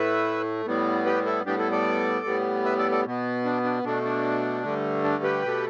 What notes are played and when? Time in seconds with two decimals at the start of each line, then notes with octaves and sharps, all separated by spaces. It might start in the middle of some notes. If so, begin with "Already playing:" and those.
Already playing: A2 A3 B4 E5
0.66 A2 G3 B3
1.05 G4 B4
1.25 E4 A4
1.46 A2 G3 B3 D4 G4
1.59 E4 A4
1.72 A4 D5
2.26 A2 G3 B3
2.65 B4 E5
2.78 A4 D5
2.92 A4 D5
3.05 B2 B3
3.45 D4
3.64 D4
3.84 B2 A3 D4
4.05 D4
4.63 G2 D3 A3
5.04 D4
5.23 G4 B4
5.43 B2 A3